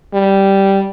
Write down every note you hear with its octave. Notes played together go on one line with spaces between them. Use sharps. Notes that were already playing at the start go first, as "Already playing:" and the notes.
G3